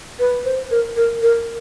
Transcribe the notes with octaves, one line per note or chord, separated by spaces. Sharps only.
B4
C5
A#4
A#4
A#4